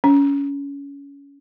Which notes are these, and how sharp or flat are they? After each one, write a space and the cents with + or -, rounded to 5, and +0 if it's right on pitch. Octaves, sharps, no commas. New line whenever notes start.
C#4 +25